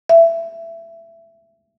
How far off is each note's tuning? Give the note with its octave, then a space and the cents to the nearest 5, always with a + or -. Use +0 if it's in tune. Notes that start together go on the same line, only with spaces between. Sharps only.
E5 +20